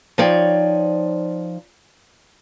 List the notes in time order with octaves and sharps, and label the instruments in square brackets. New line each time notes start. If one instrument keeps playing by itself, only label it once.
[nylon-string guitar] F3 D#4 C#5 D5 G5